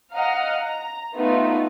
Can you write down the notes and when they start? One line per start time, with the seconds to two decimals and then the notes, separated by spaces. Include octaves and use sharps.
0.12 D#5 F5 F#5 A#5 F6
0.61 A#5
1.14 A3 B3 D#4 F4